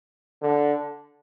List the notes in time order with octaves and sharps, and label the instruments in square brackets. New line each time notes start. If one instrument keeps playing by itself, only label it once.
[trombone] D3